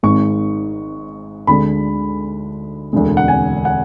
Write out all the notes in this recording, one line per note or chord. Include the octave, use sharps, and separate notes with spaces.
G#1 G#2 G#3 C#6
D2 D3 G#3 B5
E1 D2 D3 G#3
F#5
G#5
F#5